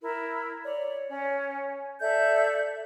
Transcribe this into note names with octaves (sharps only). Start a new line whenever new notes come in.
E4 A#4
C#5 D5
C#4
A4 D5 E5 G6